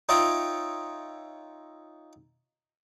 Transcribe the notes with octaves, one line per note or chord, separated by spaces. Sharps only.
D#4 F4 C#5 D#5 E5 G5